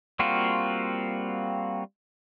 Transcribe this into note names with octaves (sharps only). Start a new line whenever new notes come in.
G3 A#3 C4 F4 F#4